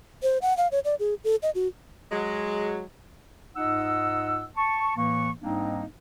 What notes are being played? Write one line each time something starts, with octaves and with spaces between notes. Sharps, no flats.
C5
F#5
F5
C#5
D5
G#4
A4
D#5
F#4
F#3 G#3
G#2 D#4 F4 D#5 F#5 E6
A5 C#6
A2 E3 A#3 C#6
G#2 G3 A#3 C4 D4 D#4